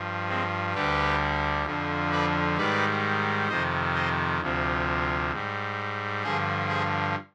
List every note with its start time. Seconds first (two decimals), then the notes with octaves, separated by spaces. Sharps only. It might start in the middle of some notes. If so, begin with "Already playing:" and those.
Already playing: G2 F3
0.29 G#3 C4
0.74 D2 D3 G3 G4 B4
1.66 F2 D3 F3
2.12 B4 D5
2.57 G#2 D#3 G3 B4 D5
3.49 F2 C3 D#3 C5 D#5
3.95 C5 D#5
4.40 D2 C3 F3
5.32 G#2 G3
6.24 G2 D3 F3 G#4 C5
6.69 G#4 C5